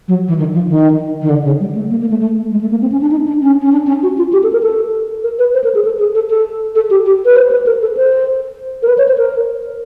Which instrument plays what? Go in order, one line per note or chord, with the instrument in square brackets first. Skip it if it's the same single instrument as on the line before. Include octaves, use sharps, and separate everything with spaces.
[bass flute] F#3
E3
D#3
F3
D#3
D#3
D3
C#3
G3
A3
A#3
A#3
A3
A3
G#3
A3
A#3
C4
C#4
D4
D#4
D4
C#4
C#4
D4
C#4
F#4
F4
G4
A4
A#4
A4
A#4
B4
C5
A#4
G#4
A4
G#4
A4
A4
A4
G4
G4
B4
C5
B4
A#4
A4
C5
A#4
B4
C#5
C5
A#4